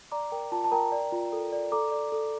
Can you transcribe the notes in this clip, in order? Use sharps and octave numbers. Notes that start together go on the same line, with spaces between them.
D5 A#5 D6
A#4 G5
F4 A5
A5
A#4 G5 A#5
D5
F4
A4
D5
A4 A#5 D6
D5
A4